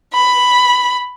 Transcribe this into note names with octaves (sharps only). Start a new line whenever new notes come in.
B5